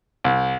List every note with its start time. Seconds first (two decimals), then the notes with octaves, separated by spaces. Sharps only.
0.24 C2